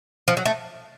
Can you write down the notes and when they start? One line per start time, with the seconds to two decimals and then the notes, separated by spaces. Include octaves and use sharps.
0.28 F3
0.37 F#3
0.45 A3